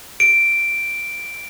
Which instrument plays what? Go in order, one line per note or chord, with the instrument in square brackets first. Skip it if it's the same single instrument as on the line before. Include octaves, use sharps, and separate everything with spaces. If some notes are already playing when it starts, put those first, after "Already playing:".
[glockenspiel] D7